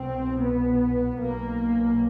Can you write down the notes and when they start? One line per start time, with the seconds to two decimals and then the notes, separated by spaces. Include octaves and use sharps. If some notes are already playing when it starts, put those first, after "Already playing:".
Already playing: C2 B2 C4
0.43 B3
1.21 B1 B2 A#3